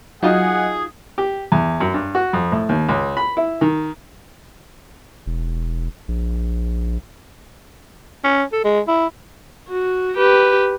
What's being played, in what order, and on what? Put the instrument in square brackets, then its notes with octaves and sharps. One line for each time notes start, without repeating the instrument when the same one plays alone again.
[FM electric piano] F#3 D#5 [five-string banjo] D#4 F4 F#4 [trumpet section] G#4 [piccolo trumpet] F#5
[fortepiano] G4
E2
F#2
G2
F#4
F2
A2
D#2
C#2
B5
E4
D#3
[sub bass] E1
A#1
[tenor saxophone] C#4
A4
G#3
E4
[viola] F#4
G4 B4